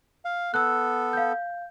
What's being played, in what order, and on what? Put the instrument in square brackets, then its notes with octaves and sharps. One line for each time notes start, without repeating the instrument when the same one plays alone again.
[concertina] F5
[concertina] B3 A4 [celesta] E6 F#6
[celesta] F5 G6